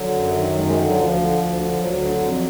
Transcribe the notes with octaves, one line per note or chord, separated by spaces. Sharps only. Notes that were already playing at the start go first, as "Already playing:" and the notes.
Already playing: D3 F#3
F#2
D#3
F#2 G#3
G#3
D3 F#3
F#3
D2 F3
D3
D2
D3
D2 F#3
D3
F2